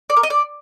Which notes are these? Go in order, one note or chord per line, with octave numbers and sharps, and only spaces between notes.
D5
A#4
D#5
D5